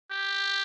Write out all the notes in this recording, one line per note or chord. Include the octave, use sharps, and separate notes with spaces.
G4